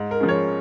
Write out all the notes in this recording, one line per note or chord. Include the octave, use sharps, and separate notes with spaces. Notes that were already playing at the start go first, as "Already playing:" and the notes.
Already playing: G#2
A#4
F3 G#3 C#4
C#5